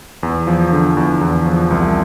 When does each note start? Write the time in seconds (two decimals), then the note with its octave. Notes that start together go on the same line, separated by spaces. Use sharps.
0.23 E2
0.47 F3
0.72 D3
0.97 E2
1.21 E2
1.46 F3
1.71 C2